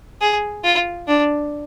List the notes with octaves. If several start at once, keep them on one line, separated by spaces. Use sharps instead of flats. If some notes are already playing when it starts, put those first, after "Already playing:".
G#4
F4
D4